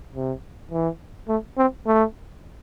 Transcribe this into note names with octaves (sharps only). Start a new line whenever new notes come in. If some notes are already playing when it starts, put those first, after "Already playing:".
C3
E3
A3
C4
A3